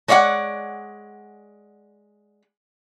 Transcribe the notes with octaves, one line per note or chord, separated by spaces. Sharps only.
G#3 C#5 D5 E5 F#5